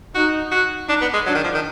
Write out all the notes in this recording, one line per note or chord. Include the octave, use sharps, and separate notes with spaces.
D#4 F#4
F#4
D4 D#4
B3
G#3
F#3 D4
D#3
F3
D#3